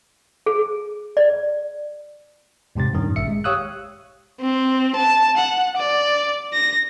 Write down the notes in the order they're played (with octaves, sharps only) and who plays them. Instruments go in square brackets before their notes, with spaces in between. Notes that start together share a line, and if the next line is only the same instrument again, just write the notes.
[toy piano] G#4
D5
[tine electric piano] E2 G#2 C3 C4 A6
G2 A#2 D#3 C#4
A1 E5 C#7
G#3
G4 C#5 F5 D#6 E6 F#6
[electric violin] C4
A5
F#5
D5
A#6